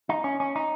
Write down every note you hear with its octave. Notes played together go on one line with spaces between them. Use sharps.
D#4
C#4
C#4
D#4